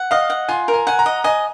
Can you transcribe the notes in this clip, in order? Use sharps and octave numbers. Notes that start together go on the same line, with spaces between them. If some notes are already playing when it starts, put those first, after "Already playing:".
Already playing: F#5
D#5 F5
F#5
F4 G#5
A#4
G#5
F#5 G#5
A#5
D#5
D#5 G#5